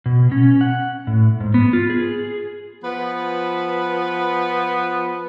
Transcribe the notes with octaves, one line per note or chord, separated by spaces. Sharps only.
B2
C#4
F#5
A2
G#2
B3
F4
G#4
F3 B3 B4